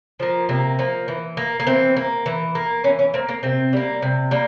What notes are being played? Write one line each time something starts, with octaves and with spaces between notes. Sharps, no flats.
F3 A#3
C3 A#3
F3 A#3
E3
A#3
A#3
E3 C4
A#3
E3
A#3
E3 C#4
C#4
A#3 C4
A#3
C3 C4
G3 A#3
C3
G3 A#3